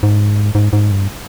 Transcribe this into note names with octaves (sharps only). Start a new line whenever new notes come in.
G#2
G#2
G#2
G2